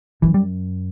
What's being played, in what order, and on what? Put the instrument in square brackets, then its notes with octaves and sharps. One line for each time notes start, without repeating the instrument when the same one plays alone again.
[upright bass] F#2 [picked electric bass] E3
[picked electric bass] G3